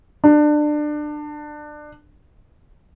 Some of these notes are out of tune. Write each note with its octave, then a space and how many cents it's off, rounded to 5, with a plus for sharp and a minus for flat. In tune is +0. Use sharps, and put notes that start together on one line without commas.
D4 +25